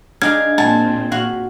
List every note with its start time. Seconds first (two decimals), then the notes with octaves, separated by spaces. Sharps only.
0.22 D4 D#4 G#4 F5 G#6
0.58 A#2 C4 G#5 A5
1.11 A#2 F#4 F5